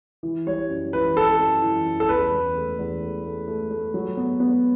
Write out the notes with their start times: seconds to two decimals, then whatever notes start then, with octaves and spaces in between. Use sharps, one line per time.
0.23 E3
0.47 G3 C#5
0.70 F#2
0.93 E3 B4
1.16 E3 A4
1.39 F#2
1.62 E3
1.86 F#2
2.00 A4
2.09 E2 B4
2.32 E2
2.55 A3
2.79 E2
3.02 A3
3.25 A3
3.48 A3
3.71 A3
3.94 F#3
4.17 B3
4.40 B3